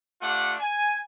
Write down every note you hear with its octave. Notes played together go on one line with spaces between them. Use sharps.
A3 D4 F4 G4 F#5
G#5